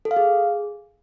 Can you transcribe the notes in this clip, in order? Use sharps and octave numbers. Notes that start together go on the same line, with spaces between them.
A4
F5
G#4